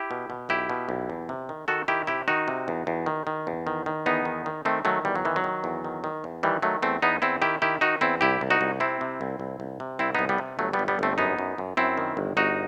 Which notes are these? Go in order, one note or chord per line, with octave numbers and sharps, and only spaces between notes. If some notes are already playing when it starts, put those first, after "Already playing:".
Already playing: E4 G4
B2
B2
B1 E4 G4
B2
B1
E2
C3
D#3
D#3 F#4 A4
D#3 E4 G4
C3 E4 G4
D#3 D#4 F#4
C3
E2
E2
D#3
D#3
E2
D#3
D#3
E2 B3 D#4
D#3
D#3
D#3 A3 C4
D#3 F#3 A3
E2 G3
F#3
D#3 E3
F#3
D#3
E2
D#3
D#3
E2
D#3 E3 G3
D#3 F#3 A3
E2 A3 C4
E2 B3 D#4
E2 C4 E4
D#3 E4 G4
D#3 E4 G4
D#3 D#4 F#4
E2 C4 E4
C2 E4 G4
C2
D#4 F#4
C2
C3 C4 E4
C3
C2
C2
C2
C3
C2 C4 E4
C2 B3 D#4
G3 B3
C3
G1 F#3 A3
G3 B3
G1
G3 B3
G1 A3 C4
F#2 B3 D#4
F#2
F#2
F#2 C4 E4
D#3
G1
G1 D#4 F#4